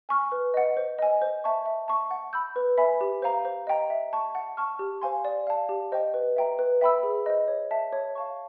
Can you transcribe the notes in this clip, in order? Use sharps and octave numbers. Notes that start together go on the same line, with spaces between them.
G#5 C#6 F6
B4
D#5 F#5
C5
D#5 G#5
C5
E5 A5 C#6
E5
A5 C#6
F#5
B5 E6 G6
B4
E5 G#5 B5
G4
C5 F5 A#5
C5
D#5 G5 A#5
E5
A5 C#6
F#5
A5 C#6 F6
G4
C5 F5 G#5 C6
D5
F5 A5
G4
C5 D#5 G5
B4
E5 G5 A#5
B4
E5 G5 B5 E6
G#4
C5 D#5
C#5
E5 A5
C#5
F5 A5 C#6